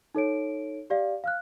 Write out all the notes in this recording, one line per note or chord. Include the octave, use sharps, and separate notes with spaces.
D#4 A4 C#5 D7
G4 D5 F5
F5 F6 F#6